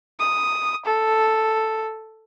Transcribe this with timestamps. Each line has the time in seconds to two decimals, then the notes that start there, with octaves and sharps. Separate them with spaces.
0.20 D#6
0.86 A4